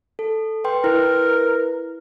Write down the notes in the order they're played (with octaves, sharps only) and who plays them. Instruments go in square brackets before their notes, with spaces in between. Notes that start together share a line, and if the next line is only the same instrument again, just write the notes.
[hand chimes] A4
B4 G5 C6
[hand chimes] E4 B4 [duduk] A#4